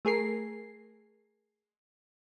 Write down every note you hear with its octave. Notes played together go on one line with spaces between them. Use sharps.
A3 G#4 A#4 C7